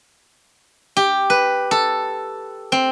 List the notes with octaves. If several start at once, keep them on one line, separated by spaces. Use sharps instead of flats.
G4
B4
A4
C4